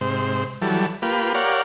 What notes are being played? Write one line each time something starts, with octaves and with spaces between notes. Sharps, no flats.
G#2 C3 C5
E3 F#3 G3 A4
A#3 F4 G4 B4
G4 A#4 C#5 D5 F5 F#5